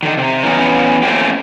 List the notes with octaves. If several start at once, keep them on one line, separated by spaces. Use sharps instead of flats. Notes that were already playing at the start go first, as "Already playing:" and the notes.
D3 D#3
C3
E3 B3 C#4 A#4
A3 A#3 C4 C#4 F4 G4